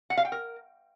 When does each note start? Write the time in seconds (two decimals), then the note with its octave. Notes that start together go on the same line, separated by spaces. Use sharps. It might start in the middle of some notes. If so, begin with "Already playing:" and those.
0.10 F#5
0.17 F5
0.25 G5
0.32 A#4